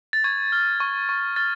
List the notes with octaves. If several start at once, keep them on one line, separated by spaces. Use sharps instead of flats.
A6
C#6 G#6
F6
C#6
C#6
F6 A6